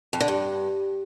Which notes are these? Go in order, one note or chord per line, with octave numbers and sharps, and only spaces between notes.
F2
D3
G2